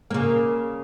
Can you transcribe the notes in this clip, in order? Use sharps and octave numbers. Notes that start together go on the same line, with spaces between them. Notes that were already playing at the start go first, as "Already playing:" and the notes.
C#3 A#3